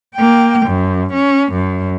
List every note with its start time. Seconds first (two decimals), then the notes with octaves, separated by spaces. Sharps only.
0.15 A#3 G5
0.66 F#2
1.13 C#4
1.52 F#2